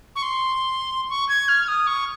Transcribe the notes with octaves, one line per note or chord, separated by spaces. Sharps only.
C#6
C6
C#6
G#6
F6
D#6
C#6